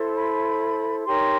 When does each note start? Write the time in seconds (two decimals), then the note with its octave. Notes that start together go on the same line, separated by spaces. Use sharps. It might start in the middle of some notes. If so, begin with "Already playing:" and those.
Already playing: E4 A4 C5
0.15 B5
1.05 D#4 G4 A#4 C#5 C6